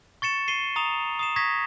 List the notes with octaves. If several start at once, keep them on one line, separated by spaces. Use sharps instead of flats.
C#6 A6 C#7 E7
C7 D#7 G7
A#5 D#6 F7
D#6 C7 E7
C#6 D#6 G#6 A#6 B6